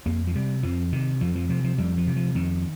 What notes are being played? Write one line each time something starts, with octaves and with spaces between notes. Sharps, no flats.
F2 A#3
F3
C3 G3
F2 F3
C3 D#3
F2 F3
F3
C3 F3
F3
F2 G3
F3
C3
F3
F2 D#3